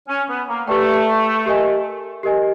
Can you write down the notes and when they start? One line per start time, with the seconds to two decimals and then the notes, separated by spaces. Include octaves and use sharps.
0.09 C#4
0.28 B3
0.48 A#3
0.68 A3 G4 B4 D5 G5
1.46 G4 A#4 D#5 G#5
2.23 G4 A#4 D#5 G#5